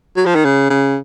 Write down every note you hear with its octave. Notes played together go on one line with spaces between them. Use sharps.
F#3
F3
D#3
C#3
C#3